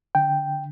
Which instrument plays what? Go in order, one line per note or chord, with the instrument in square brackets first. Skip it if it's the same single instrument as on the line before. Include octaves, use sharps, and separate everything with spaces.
[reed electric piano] D3 G5